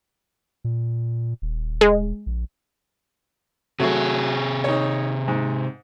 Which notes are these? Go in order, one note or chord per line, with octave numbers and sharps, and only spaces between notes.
A#2
D#1
G#3
A#1
C3 F#3 A3 F#4 G#4
D#4 C#5
G#2